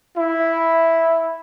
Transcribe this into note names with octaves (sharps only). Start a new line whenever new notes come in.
E4